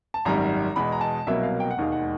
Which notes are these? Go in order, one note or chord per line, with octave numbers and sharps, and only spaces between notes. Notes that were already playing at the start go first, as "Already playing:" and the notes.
A5
G#1 F#2 D#3 G3 A#5
E2 B2 G#3 B5
A#5
A5
C2 B2 F#3 A#3 E5
F5
G5
F#5
E1 D#2 D#3 G#3 F5
F#5